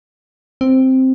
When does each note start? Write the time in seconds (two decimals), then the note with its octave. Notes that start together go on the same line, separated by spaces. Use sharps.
0.61 C4